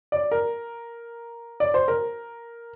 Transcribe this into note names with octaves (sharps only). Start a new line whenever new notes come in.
D5
A#4
D5
C5
A#4